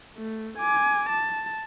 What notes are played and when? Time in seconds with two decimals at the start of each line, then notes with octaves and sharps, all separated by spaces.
0.18 A3
0.57 G#5 D6
1.09 A5